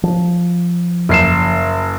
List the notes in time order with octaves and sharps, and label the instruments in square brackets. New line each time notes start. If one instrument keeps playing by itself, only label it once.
[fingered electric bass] F3
[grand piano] F#1 C7 E7